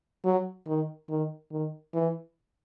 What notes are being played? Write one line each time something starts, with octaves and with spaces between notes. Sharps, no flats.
F#3
D#3
D#3
D#3
E3